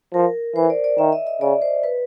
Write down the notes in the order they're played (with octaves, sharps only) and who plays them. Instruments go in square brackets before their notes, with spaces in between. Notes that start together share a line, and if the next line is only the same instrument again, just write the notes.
[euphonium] F3 [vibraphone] A#4
[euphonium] E3 [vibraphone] C5
[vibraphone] D5
D5
[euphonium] D#3 [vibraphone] E5
[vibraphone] D#5
D#5
[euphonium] C#3 [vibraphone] D5
[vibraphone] C5
B4